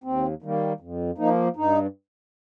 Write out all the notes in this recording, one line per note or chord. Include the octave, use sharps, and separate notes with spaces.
D#2 C4
D#3 G3 A#3
F2
F3 A#3 D#4
G2 D#4